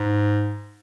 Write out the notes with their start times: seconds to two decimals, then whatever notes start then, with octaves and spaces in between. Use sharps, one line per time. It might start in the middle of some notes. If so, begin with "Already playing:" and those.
Already playing: G#2